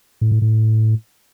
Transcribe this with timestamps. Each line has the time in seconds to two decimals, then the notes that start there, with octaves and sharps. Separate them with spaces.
0.21 A2
0.32 A2
0.42 A2